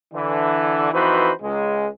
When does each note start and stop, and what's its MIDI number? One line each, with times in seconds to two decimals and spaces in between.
0.14 0.92 50
0.14 0.92 52
0.93 1.31 41
0.93 1.31 52
0.93 1.31 63
0.93 1.31 66
0.93 1.31 71
0.93 1.31 72
1.42 1.87 37
1.42 1.87 56